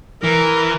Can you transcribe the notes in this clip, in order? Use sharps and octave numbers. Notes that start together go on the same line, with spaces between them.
E3 A#4